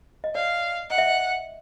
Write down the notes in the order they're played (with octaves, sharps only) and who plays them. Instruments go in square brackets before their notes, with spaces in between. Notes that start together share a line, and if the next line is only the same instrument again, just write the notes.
[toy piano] D#5
[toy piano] D5 [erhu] F5
[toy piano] D#5 [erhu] F#5
[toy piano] E5
D#5